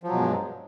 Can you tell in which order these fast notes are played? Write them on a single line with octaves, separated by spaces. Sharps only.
F3 F#3 B2 G#3 G2